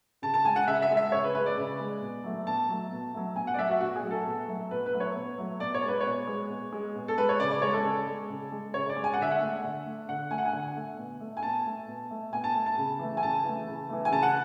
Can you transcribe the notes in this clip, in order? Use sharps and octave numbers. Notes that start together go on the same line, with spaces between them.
C#3 A5
A5
G#3 G#5
F#5
C#3 E5
E5
G#3
E5
C#3 C#5
B4
G#3 B4
D5
C#3
G#3
B2
F#3 A3
B2 A5
F#3 A3
B2
F#3 A3
B2 G#5
F#5
D5
F#3 A3 E5
F#4
B2 F#4
G#4
F#3 A3
A4
B2
F#3 A3
B2 B4
B4
F#3 A3
C#5
B2
F#3 A3
B2 D5
C#5
G#3
B4
C#5
B2
G#3
B2
G#3
B2
A4
G#3 B4
C#5
C#3 D5
D5
G#3 C#5
A4
C#3
G#3
C#3
G#3
C#3 C#5
D5
G#3
G#5
F#5
D3 E5
F#5
A3
D3
A3
D3 F#5
A3 G#5
F#5
G#5
D3
A3
B2
A3
G#5
B2 A5
A3
B2
A3
B2 G#5
A5
A3
A5
C#3
E3 A3
G#5
C#3 A5
E3 A3
C#3
E3 A3
G#5
C#3 A5
F#5